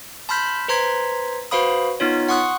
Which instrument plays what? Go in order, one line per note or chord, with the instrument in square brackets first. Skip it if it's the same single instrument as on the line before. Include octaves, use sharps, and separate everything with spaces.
[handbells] A5 B5 C6 F6 G6 B6
B4 C5 A#5 C6 G#6 B6
F#4 B4 C5 F5 B5 D#6
B3 D#4 F4 C#5
F#5 C6 C#6 D#6 F#6